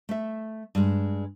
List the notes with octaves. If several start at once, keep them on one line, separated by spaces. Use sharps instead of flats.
A3 E5
G2 G#3